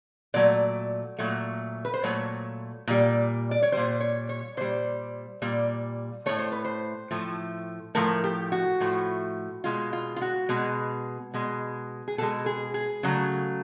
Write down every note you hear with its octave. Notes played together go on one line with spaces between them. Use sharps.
A#2 F#3 A3 D5
A#2 F#3 A3
B4
C5
A#2 F#3 A3 C#5
A#2 G3
D5
C#5
A#2 G3 C5
C#5
C#5
A#2 G3 C5
A#2 G3
A2 F3 A3 C#5
C5
B4
C5
A2 F3 A3
A2 F3 A3 A#4
G4
F#4
A2 F3 A3
B2 G#3 F4
F4
F4
F#4
B2 G#3
B2 G#3
G#4
B2 G#3 A4
G#4
G#4
C#3 F#3 A3